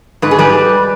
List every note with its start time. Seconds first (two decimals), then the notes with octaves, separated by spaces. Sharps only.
0.22 G#2 B4
0.31 G#4
0.39 G3 B4